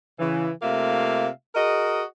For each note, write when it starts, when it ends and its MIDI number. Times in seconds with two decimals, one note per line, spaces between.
0.19 0.49 49
0.19 0.49 52
0.62 1.28 48
0.62 1.28 57
0.62 1.28 58
0.62 1.28 65
0.62 1.28 76
0.62 1.28 77
1.55 2.03 66
1.55 2.03 68
1.55 2.03 70
1.55 2.03 75